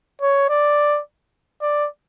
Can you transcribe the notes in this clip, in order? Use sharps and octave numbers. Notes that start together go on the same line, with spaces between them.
C#5
D5
D5